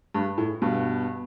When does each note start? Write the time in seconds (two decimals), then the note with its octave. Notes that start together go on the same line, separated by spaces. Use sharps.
0.14 G2
0.38 A2
0.62 G2 B2